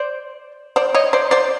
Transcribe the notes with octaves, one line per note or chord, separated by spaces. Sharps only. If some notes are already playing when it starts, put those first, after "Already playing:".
Already playing: C5 D5
C5 D5
C#5 D#5
C5 D5
C5 D5